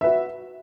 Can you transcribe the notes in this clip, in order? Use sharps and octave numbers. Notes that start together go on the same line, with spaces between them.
F#4 B4 E5